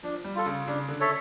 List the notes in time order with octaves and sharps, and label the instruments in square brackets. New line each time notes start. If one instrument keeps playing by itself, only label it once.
[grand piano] F3 [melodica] D4
[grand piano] G3
[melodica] F4 A4
[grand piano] C#3
[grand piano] C#3 [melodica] D4
[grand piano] D3
[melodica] A4 C#5 E5